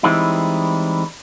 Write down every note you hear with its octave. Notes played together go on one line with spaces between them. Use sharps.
E3 G3 G#3 C4 D#4 E4